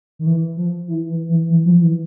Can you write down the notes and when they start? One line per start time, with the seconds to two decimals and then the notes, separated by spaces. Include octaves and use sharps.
0.19 D#3
0.26 E3
0.57 F3
0.88 E3
1.09 E3
1.29 E3
1.50 E3
1.66 F3
1.81 E3